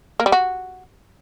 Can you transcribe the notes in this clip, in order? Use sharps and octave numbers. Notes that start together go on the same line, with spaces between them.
A#3
G3
F#4